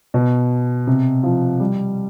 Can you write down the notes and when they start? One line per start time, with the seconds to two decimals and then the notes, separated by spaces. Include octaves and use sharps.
0.14 B2
0.87 C3
1.23 F3
1.60 G3